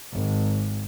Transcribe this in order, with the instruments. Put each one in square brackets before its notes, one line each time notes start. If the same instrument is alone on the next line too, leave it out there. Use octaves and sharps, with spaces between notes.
[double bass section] G#1